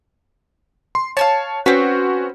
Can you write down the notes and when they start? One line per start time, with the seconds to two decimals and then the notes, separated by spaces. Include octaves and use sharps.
0.95 C6
1.17 C#5 F5 G#5 A5
1.66 C4 C#4 F#4 B4